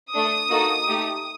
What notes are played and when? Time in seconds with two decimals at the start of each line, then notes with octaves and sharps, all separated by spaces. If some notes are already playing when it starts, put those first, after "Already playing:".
0.13 A3 D4 A4 D#6
0.50 A#3 D#4 F#4 A4
0.87 A3 D#4 G4